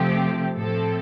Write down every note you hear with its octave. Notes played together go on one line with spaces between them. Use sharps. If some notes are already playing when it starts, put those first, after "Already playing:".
Already playing: C3 F3 A3 C4 G4
A2 F3 C4 A4